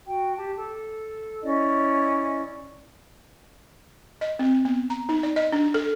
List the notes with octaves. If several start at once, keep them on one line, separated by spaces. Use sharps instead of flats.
F#4 G5
G4 A5
A4
C#4 E4 D5 D#5
D#5
C4
B3
A#5
D#4
D5
D#5
D4
A4